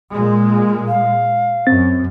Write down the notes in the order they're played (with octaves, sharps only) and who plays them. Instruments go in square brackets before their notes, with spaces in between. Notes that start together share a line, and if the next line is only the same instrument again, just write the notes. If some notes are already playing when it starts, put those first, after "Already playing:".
[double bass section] A#2 G#3
[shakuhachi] F5
[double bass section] F#2 [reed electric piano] C4 A6